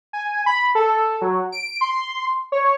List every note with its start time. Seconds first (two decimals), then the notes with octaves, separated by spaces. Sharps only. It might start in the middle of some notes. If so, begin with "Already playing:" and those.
0.13 G#5
0.46 B5
0.75 A4
1.21 F#3
1.52 D7
1.81 C6
2.52 C#5